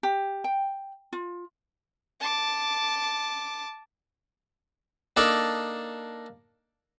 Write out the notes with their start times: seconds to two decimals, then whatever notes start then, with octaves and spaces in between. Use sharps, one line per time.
0.03 G4
0.44 G5
1.13 F4
2.21 A5 D6
5.17 A#3 D4 D#4 A4 D5